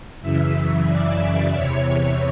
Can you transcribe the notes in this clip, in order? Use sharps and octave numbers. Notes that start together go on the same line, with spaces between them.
F#2 C#3 E3 E5
D5
E2 C3 E3 C#5